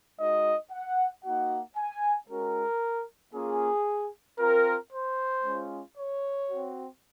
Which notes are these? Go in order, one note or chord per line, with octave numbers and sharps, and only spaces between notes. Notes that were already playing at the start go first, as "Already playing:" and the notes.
G#3 D#4 F#4 D#5
F#5
A#3 D#4 F#4 F#5
G#5
G#3 C#4 F#4 A#4
A#3 C#4 F4 G#4
C4 F4 A#4
C5
G#3 C#4 F4
C#5
C4 F#4